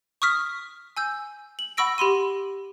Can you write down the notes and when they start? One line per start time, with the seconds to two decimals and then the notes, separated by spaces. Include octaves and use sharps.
0.22 C#6 D#6 F6 B6
0.97 G#5 E6 G6
1.59 F#7
1.77 F#5 B5 C#6 E6 A#6 D7
1.98 G4 B5 C6 D#7